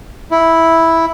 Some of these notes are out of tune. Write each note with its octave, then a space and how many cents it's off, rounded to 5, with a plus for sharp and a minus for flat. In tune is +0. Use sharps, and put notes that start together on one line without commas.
E4 -5